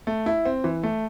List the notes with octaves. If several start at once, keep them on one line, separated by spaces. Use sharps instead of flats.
A3
E4
C4
E3
A3